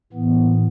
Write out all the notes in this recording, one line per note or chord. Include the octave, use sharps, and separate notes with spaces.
A2 E3 B3